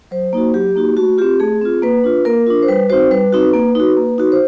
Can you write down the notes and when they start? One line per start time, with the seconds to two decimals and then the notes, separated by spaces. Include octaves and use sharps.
0.11 F#3 C5
0.33 A#3 D#4 F#4
0.54 F#3 G4
0.76 A#3 D#4 F#4
0.97 A3 F#4
1.18 C4 F4 G4
1.40 A3 G#4
1.61 C4 F4
1.82 A#3 B4
2.04 D4 F4
2.25 A#3 A#4
2.47 D4 F4
2.63 C5
2.68 G3 B4
2.90 C4 D#4 F#4 C5
3.11 G3 B4
3.32 C4 D#4 F#4
3.54 A#3
3.75 D#4 F#4
3.97 A#3
4.18 D#4 F#4
4.32 C5